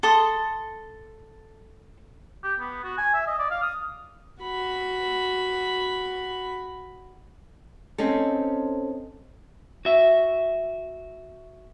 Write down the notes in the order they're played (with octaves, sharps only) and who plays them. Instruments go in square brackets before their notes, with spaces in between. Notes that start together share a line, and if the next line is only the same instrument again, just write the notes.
[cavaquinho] A4 C6 D#6
[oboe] G4
B3
F#4
G#5
E5
D#5
D5
F5
D#6
[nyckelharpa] F#4 B5
[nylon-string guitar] C4 C#4 D#4 A4
[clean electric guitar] F#4 E5